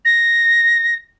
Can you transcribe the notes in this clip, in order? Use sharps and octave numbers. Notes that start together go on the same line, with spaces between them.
A#6